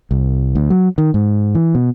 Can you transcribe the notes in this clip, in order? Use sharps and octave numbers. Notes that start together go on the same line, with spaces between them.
C2
D2
F#3
D#3
G#2
E3
B2